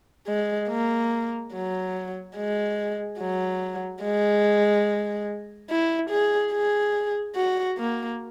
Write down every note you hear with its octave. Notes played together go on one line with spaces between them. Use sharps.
G#3
A#3
F#3
G#3
F#3
G#3
E4
G#4
G#4
F#4
A#3